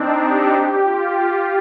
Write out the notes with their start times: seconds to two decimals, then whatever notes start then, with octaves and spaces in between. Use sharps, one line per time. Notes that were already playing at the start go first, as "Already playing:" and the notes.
Already playing: C4 D4 D#4
0.24 G4
0.54 G4
0.83 F4
1.14 F4